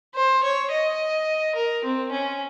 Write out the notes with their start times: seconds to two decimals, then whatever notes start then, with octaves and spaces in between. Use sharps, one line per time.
0.16 C5
0.43 C#5
0.71 D#5
1.55 A#4
1.84 C4
2.11 C#4